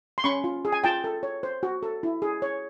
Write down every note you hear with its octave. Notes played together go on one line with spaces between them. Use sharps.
C6
C#4 B5 C#6
F4
G#4
G#5
F4 G5 A5
A4
C#5
C5
F#4
A4
E4
G#4
C#5